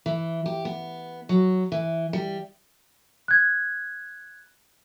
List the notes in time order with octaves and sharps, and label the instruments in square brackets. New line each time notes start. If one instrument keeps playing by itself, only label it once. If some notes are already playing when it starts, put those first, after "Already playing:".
[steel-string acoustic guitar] E3
G4
B3
F#3
E3
G3
[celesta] F#6 G#6